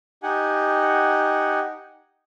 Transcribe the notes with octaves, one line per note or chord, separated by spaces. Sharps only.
D#4 G4 F#5 G#5